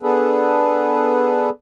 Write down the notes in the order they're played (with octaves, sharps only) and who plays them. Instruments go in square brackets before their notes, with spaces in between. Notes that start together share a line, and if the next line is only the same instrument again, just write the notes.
[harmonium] B3 D4 G#4 A4 B4